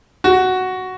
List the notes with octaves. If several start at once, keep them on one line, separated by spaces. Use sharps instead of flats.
F#4